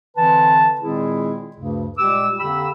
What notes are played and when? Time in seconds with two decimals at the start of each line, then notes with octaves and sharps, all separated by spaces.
0.17 D3 E3 C4 B4 A5
0.81 A#2 D#3 G#3 C4 E4 G#4
1.57 D2 G2 C#3
1.98 A#2 G3 G#3 G4 D6 E6
2.39 F2 D3 A#3 G4 B5 E6